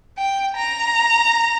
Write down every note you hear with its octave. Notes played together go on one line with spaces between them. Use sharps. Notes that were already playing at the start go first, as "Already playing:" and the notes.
G5
A#5